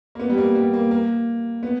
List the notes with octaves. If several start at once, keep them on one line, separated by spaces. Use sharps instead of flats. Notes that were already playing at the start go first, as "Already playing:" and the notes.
A#3
B3
G3
A#3
G3
A#3
A#3
B3